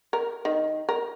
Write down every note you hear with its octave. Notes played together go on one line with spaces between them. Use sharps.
A#4
D#3
A#4